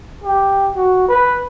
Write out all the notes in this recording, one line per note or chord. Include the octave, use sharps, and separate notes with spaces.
G4
F#4
B4